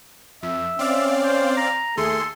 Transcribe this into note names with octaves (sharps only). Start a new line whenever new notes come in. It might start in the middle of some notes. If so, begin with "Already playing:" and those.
F2 E5
C4 C#4 D5 F5
C5
A#5
D#2 A3 G#4 A4 C6